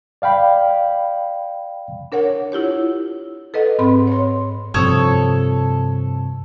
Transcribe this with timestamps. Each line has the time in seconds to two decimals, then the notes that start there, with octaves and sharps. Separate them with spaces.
0.22 D5 F5 G5 B5
2.12 D4 A#4 C#5 F#5
2.52 E4 F4 G4 C#5
3.54 A4 B4 D#5 F#5
3.79 G#2 C4 B5 C6
4.07 C#5 C6
4.74 G2 C3 F3 A4 C#5 D#6